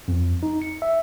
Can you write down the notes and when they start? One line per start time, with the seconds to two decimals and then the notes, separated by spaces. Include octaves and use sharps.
0.08 F2
0.43 D#4
0.62 C#7
0.82 E5